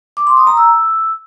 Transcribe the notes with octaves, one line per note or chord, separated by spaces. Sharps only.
D6
C6
D#6
A#5
E6